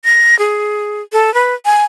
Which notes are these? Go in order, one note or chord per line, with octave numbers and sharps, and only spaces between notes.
A#6
G#4
A4
B4
G#5